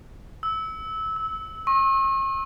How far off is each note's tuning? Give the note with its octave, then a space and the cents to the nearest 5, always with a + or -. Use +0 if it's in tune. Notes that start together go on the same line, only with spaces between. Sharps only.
E6 -20
E6 -35
C#6 -45